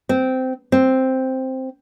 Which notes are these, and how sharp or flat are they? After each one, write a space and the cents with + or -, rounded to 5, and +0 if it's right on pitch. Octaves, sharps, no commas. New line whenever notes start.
C4 -15
C4 +0